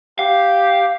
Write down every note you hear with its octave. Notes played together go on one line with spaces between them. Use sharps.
G4 F5